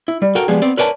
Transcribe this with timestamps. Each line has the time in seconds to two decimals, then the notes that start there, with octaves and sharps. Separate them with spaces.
0.08 E4
0.22 G3
0.35 F#4 A4 A#4 G5
0.48 F3 G3 G#3 B3 G#4
0.62 B3 C4 D5
0.77 A#4 B4 C#5 D5 G#5 A5